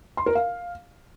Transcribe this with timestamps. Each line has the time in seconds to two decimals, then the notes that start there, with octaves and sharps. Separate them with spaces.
0.17 C6
0.26 A#4
0.35 F5